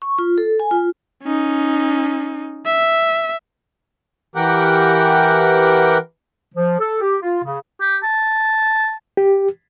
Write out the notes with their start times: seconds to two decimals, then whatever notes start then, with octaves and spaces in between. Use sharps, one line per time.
0.02 C#6
0.19 F4
0.38 A4
0.60 G#5
0.71 F4
1.23 C#4 D#4
2.66 E5
4.36 E3 G4 A#4 F#5 G5
6.55 F3
6.80 A4
7.01 G4
7.22 F4
7.44 C#3
7.80 G4
8.03 A5
9.17 G4